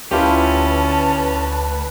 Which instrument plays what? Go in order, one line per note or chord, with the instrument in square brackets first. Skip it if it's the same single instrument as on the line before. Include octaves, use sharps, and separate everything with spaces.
[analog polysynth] D2 B4 [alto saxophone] C#4 [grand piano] E4 F4 G4 [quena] A5